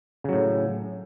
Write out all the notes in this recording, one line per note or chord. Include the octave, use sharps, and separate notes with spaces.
A2 C#3 F#3